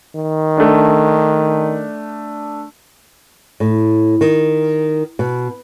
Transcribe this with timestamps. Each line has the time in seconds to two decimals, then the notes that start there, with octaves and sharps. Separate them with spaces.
0.16 D#3
0.57 A3 D4
3.60 A2
4.21 D#3
5.19 B2